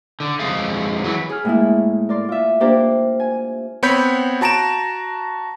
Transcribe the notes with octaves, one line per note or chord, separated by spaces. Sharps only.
D3
F2 G#3 G#4 F5
E3 F#3
G#4 F6
A2 G#3 A#3 E4
A#4 D5 C6
F4 E5
A#3 D4 G4 A#4 C5
G#5
B3 C4 C#5 B5 G6 B6
F#4 A5 A#5 D7 E7